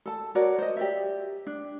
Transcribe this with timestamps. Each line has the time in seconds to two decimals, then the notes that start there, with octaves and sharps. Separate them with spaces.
0.06 A4 A5
0.35 F#4 A#4 C#5 D5
0.59 C5 D#5
0.77 G4 D5 E5
1.47 D4